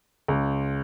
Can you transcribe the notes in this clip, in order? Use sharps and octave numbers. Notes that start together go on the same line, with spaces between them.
C#2